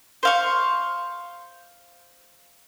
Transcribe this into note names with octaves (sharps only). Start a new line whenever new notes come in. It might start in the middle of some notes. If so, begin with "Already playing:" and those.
C5 F5 C#6